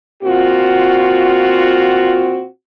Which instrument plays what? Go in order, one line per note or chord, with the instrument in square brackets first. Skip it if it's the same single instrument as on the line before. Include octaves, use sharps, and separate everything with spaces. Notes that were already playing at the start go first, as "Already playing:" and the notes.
[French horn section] A#2 C4 F4 F#4